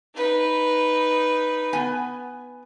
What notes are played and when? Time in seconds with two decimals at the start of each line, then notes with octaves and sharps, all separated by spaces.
0.16 D#4 B4
1.73 B3 G#5